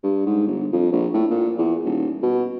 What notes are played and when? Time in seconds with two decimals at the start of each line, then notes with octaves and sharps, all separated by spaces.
0.03 G2
0.26 G#2
0.47 G1
0.73 F2
0.92 A#1
1.14 A2
1.31 A#2
1.58 E2
1.85 D#1
2.23 B2